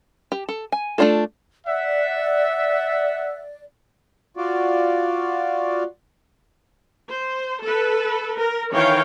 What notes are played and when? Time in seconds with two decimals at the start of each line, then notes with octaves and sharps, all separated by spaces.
0.32 G4
0.49 A4
0.72 G#5
0.98 A3 B3 D4 F4 A4
1.66 D5 E5 F#5
4.37 F4 F#4 D5
7.08 C5
7.62 A4 B4
8.38 A#4
8.71 D#3 E3 C#5 F5 G5